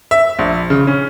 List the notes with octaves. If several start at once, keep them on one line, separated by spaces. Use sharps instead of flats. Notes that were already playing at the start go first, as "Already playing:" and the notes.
E5
A#1
C#3
C#4